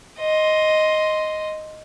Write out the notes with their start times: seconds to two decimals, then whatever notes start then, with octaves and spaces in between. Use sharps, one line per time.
0.19 D#5 C6